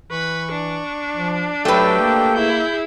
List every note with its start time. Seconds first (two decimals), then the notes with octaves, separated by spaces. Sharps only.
0.11 E3 B4 C#6
0.52 D4
1.16 F3
1.65 F#3 A3 G4 A4 B4 G5
2.00 A#3
2.35 E4 G#4 G6